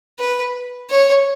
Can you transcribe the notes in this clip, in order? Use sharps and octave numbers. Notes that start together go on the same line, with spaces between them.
B4
C#5